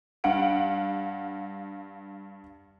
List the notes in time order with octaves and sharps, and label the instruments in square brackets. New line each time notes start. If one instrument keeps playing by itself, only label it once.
[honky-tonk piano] G2 F5 F#5 D7